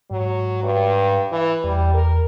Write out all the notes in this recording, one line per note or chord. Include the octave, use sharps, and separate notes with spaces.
G#2 F#3
G2
E3
E2 G3
A#4